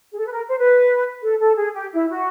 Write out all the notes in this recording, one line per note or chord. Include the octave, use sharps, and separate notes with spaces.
G#4
A4
B4
A#4
C5
B4
A4
A4
G#4
G4
E4
F#4